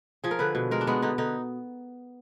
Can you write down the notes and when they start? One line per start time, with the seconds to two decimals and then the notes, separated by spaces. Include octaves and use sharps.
0.24 F3 G#4
0.31 A#4
0.39 D3 B4
0.55 B2
0.71 G#3 A#4
0.81 D4
0.87 G#3 B3
1.02 D3 D#4
1.18 D3 D#4